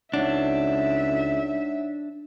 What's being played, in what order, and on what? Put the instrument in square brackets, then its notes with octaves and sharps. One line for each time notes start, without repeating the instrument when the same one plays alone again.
[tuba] C#2 [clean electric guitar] D4 [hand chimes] D#4 C#5 F#5 [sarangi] E5